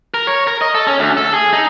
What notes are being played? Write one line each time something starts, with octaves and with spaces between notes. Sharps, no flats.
A#4
C#5
A#4
D#5
A4
C#4
D2
A4
G#4
D#4